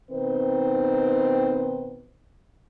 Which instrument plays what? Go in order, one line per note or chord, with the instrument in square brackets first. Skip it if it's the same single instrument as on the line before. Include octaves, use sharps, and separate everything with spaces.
[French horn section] B2 D#3 C4 D#4 B4 C5